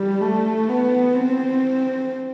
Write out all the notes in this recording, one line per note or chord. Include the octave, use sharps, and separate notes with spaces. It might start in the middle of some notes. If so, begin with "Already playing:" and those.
Already playing: G3
A3
B3
C4